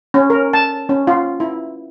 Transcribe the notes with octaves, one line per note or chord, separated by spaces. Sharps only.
C#4
A#4
A5
C#4
F4
E4